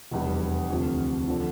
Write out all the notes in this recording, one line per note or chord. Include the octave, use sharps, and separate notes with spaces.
F1 E2 E3 G3
D2 C3 F3
D3 F3